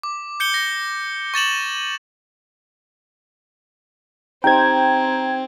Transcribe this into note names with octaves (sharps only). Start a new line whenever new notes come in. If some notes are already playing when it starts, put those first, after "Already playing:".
D6
G6 C#7 G7
A#6
C#6 A6 E7 F#7
C4 D#4 G4 C5 G5 A#5 G#6